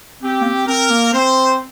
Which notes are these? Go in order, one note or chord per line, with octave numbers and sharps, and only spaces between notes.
C4 G4
A#3
C4
C4 A#4
A#3
C4 C5